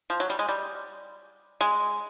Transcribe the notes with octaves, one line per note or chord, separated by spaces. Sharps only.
F3
F#3
G3
G#3
G3
G#3